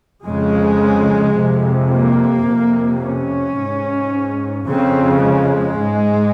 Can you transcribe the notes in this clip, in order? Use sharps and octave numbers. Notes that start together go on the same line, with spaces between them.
F2 C#3 G#3
F2 C3
A#3
F2 C3
C#4
G#2
F2 C#3 C4
G#3
G#2